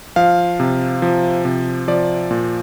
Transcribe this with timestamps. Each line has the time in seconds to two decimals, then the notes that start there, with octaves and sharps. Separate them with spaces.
0.16 F3 F5
0.60 C3
1.02 F3
1.45 C3
1.88 F3 D5
2.31 A#2